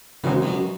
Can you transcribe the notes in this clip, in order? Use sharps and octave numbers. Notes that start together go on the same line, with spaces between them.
F#2 C#3 E3 G#3 C4 D#4
F2
F#2